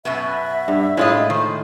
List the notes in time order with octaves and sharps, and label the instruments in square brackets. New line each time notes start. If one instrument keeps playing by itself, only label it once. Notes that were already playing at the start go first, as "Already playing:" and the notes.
[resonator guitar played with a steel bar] F#2 B2 B3 [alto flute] E5
[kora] G2
[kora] A2 G#3 [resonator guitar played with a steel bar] E4 F4 D#5
[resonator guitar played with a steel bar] D#3 [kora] C5